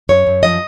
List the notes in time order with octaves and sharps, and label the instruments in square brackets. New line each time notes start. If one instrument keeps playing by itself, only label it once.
[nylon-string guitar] F#2 C#5
F#2
F3 D#5